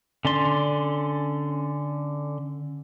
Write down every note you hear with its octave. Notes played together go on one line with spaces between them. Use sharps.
D3 C#4 D5 C6